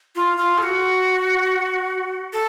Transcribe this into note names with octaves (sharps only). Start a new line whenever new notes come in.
F4
F4
A4
F#4
A4